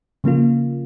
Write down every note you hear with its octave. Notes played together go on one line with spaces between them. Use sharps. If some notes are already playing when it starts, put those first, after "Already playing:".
C#3 F3 A#3 F4